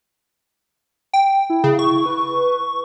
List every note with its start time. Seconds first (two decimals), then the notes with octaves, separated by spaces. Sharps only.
1.13 G5
1.50 E4
1.64 C#3
1.79 C#6
2.06 B4